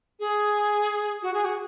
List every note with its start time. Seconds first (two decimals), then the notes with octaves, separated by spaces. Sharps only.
0.20 G#4
1.23 F#4
1.34 G#4
1.45 F#4